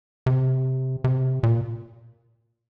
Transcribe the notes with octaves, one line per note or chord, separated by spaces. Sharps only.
C3
C3
A#2